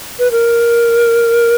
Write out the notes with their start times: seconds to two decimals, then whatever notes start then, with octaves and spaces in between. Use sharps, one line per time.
0.19 B4
0.31 A#4